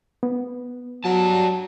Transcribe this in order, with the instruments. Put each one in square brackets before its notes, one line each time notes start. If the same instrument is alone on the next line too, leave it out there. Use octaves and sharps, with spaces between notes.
[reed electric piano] B3
[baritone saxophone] F#3 [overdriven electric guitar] G3 A5